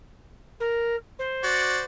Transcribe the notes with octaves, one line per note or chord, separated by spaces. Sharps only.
A#4
C5
F#4 D5